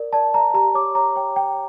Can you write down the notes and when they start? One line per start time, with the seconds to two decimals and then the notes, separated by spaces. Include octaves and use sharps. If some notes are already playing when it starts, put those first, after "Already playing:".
Already playing: A#4 D5
0.13 D5 A5
0.33 D5 A#5
0.54 G4 A#5
0.74 C#5 D6
0.95 C#5 A#5
1.16 C#5 G5
1.36 C#5 G5